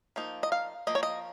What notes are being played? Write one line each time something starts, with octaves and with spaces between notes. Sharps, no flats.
F3 A#3 D#4
D#5
F5
F3 A#3 D#5
C#5
D#5